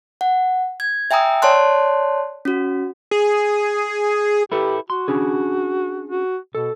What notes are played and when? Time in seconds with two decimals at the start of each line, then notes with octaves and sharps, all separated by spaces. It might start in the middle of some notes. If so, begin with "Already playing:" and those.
0.21 F#5
0.80 G#6
1.11 E5 G5 G#5 A#5 D#6 E6
1.42 C#5 D5 A5 C6 F#6
2.45 C#4 F#4
3.11 G#4
4.52 E4 G4 A4 B4
4.90 F#4 C6
5.08 C#4 D4 G#4
6.10 F#4
6.55 B2 A4